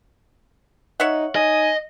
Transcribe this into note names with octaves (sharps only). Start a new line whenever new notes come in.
D#4 C#5 E5 F#5
D#4 D#5 G#5